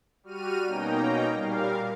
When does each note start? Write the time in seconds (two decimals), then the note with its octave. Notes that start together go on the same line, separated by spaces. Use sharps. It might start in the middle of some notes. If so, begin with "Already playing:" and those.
0.23 G3 F#4 F6 D#7
0.66 B2 A#3 C#4 D#4 G5 A#5
1.34 A#2 G3 A#4 F5